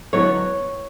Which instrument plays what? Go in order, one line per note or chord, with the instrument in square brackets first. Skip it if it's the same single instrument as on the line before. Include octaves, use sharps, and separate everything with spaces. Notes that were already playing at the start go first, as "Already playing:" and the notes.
[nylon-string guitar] D3 F#3 B3 E4 C#5